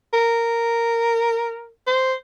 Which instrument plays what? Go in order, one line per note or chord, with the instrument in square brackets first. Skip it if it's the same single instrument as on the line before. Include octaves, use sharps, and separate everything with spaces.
[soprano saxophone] A#4
C5